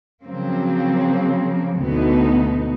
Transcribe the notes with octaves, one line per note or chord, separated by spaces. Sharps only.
C#3 F3 F#3 A#3 C4
D2 B2 B3 D#4